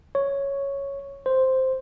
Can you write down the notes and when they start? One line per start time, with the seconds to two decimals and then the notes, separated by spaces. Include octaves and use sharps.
0.15 C#5
1.26 C5